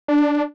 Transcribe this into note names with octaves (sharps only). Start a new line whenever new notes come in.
D4